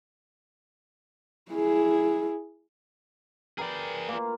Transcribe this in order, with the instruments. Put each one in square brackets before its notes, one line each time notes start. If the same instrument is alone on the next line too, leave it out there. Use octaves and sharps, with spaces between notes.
[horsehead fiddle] E4 G#4
[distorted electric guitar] G#4 D5 [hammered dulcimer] A#4 B4 G5
[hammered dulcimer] A#3 F4